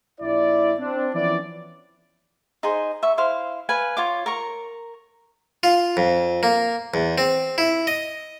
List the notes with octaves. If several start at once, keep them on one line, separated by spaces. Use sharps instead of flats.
A#1 E4 D5
C4 D4
E3 F3 B3 C#4 E4 D5
D#4 G#4 C5
E5 C#6
E4 C5 F5
B4 F5 G#5
F4 C#5 D6
A#4 A#5 C#6
F4
F2
A#3
E2
C4
E4
D#5